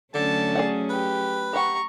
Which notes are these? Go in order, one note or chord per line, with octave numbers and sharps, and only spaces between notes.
D3 F#3 A3 C#4 A5
G#4 D5 F#5
G4 B4
G4 F#5 A#5 C#6